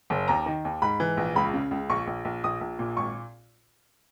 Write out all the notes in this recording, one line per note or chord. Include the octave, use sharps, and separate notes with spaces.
F#1
D#2 A#5
D#3
D#2
G#2 B5
E3
A#1
C#2 B5
C#3
C#2
A#1 C#6
A#1
A#1
A#1 D#6
A#1
A#2
G#1 C#6